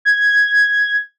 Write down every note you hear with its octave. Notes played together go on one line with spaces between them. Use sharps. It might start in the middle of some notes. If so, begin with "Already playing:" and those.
G#6